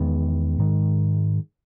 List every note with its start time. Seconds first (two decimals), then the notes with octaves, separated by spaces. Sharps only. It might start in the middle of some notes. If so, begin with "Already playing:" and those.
Already playing: E2 D#3 G#3 B3
0.58 G#2 D#3 G#3